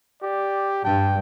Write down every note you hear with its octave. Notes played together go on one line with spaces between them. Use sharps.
G4 D5
G2 G5 A5